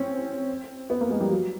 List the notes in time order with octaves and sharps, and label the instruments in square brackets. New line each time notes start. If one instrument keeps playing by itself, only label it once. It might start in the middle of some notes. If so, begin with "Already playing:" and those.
Already playing: [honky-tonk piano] C4 C#4
B3
A#3
G#3
G3
F#3